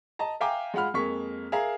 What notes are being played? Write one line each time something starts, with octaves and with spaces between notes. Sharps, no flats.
D#5 A5 A#5
E5 F5 G5 G#5 A#5 D6
G#3 F4 F#5 B5 F6
F2 G#3 A#3 C#6 B6
G#4 A#4 E5 F5 A#5